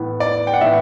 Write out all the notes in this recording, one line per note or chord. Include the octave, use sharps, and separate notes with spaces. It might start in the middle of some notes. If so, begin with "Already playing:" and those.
Already playing: A2 E3 B3
D5
G5
F#5
A2 E3 B3 E5